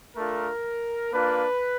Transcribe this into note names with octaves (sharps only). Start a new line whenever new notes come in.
A3 D4 F4 A#4
A#3 D4 F4 B4